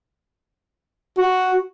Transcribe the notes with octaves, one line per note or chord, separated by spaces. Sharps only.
F#4